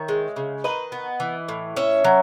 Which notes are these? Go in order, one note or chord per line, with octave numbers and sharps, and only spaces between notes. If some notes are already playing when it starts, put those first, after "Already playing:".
Already playing: D#3 C#5 E5
G#3
C#3
D#3 B4 D#5
B3
E3
A2
C#4 C#5 E5
F#3